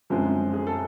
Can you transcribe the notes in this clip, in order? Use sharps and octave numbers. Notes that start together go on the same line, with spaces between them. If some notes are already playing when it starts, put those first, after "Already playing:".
F#2 D3 F3 G#3 C4
G#4
A4